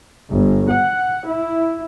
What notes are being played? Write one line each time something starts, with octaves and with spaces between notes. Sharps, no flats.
G1
F#5
E4